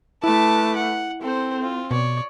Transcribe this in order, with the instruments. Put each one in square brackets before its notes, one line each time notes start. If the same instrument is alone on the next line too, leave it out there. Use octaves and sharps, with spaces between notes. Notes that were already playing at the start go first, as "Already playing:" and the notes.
[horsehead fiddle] A3 B4 [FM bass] E4 [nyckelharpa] A5 D6
[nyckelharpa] F#5
[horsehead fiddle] C4 [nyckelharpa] A4 C5
[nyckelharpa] F4
[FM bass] B2 [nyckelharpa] C#5 D5